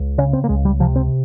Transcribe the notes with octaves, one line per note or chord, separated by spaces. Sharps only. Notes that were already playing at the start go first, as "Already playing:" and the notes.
Already playing: C#2
C#3 C#4
C4
A#3
C#2 G#3
G3
C3 F3
C4